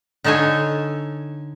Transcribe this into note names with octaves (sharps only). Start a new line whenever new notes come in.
D3 D#4 A4 C#5 G#5